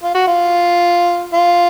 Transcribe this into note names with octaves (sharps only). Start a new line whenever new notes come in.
F4
F#4
F4
F4